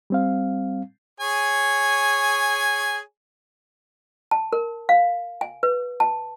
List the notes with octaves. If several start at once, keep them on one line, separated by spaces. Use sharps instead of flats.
G3 C4 F5
G#4 C#5 G#5
A5
A#4
F5
G#5
B4
A5